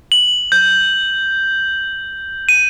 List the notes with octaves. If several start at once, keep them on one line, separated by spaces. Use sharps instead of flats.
F#7
G6
D#7